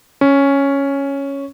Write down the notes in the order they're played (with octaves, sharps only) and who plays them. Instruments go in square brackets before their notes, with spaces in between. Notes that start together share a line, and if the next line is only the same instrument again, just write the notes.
[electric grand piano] C#4